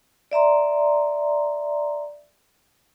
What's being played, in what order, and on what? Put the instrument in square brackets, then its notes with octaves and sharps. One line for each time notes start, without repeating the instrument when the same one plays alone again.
[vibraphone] D5 E5 A#5 C6